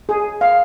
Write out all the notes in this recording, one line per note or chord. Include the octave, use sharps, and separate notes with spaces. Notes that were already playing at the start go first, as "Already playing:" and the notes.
G#4
F5